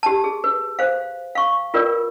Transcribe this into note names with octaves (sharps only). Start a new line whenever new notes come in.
G4 A5
G#4
B4
C5 F5
F5 C#6
F4 A#4 B4 D5